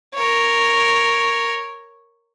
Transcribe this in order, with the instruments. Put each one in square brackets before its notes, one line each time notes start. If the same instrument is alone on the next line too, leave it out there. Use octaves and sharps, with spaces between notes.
[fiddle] A#4 C#5